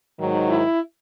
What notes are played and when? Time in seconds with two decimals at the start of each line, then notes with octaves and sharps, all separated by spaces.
0.17 G#2 D#3 F#3
0.48 E4